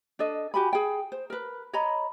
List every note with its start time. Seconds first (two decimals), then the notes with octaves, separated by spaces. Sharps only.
0.19 D4 A4 D#5
0.54 F#4 G4 G#5 B5
0.73 G#4 G5
1.12 C5
1.30 A#4 B4
1.73 C#5 D#5 A#5 B5